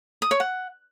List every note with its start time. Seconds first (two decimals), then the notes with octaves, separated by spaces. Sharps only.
0.22 D#6
0.31 C#5
0.40 F#5